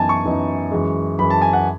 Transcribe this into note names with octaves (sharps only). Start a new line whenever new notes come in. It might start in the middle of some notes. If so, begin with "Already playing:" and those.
Already playing: F#2 E3 B3 D#4 G#5 A5
C#6
F#2 E3 B3 D#4
F#2 E3 G#3
F#2 E3 G#3 B5
A5
G#5
F#5